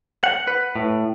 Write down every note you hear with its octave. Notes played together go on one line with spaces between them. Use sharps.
F#5
B4
A2